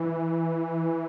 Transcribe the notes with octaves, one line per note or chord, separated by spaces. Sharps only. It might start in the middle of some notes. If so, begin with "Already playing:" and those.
Already playing: E3